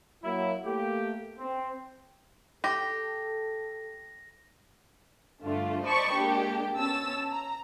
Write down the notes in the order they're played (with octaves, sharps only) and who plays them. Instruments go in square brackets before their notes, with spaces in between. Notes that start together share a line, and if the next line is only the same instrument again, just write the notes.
[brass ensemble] F#3 A#3 E4
A3 A#3 G4
C4
[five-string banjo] G4 [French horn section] A4 [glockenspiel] A#6
[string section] G2 D3 A3 D4 F4
C5 D5 D#5 A5 B5 C#6
G#3 A#3 D4 G4
B2 C#4 A5 E6
A#5